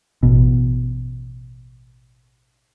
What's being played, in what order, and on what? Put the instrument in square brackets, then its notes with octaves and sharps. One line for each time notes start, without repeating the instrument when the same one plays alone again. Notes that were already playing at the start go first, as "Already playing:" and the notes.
[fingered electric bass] A1 B2